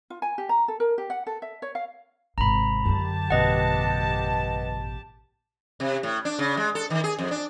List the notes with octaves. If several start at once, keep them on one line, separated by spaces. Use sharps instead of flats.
F4
G#5
G4
A#5
A4
A#4
G4
F#5
A4
E5
C#5
F5
G#1 C3 A#5 B5
F#2 D3 G4 A5
A1 B2 B4 D#5 F#5
C3
A2
D4
C#3
G#3
A4
D#3
G#4
F2
D4